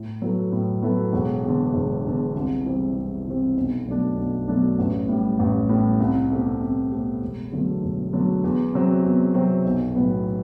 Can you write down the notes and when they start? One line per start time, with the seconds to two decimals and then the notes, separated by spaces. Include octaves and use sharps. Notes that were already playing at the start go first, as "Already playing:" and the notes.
Already playing: A2
0.22 F#3 B3 E4 A4
0.52 A2
0.82 F#3 B3 E4 A4
1.13 E1
1.43 E2 D3
1.74 E1
2.05 E2 D3
2.35 C2
2.66 C3 E3 G3 C4
2.96 C2
3.26 C3 E3 G3 C4
3.57 B1
3.87 B2 F#3 A3 D4
4.17 B1
4.48 B2 F#3 A3 D4
4.79 A1
5.08 A2 G3
5.39 A1
5.69 A2 G3
6.00 C2
6.30 B2 A3 C4 G4
6.61 C2
6.91 B2 A3 C4 G4
7.22 E1
7.52 E2 D3 F#3 A3
7.82 E1
8.13 E2 D3 F#3 A3
8.44 E2
8.74 C3 F#3 C4
9.04 E2
9.34 C3 F#3 C4
9.65 B1
9.95 A2 F#3 B3